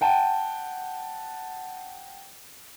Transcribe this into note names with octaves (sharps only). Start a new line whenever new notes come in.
F#5 G5 A5